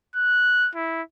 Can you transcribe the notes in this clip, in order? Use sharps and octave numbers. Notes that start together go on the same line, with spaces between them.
F#6
E4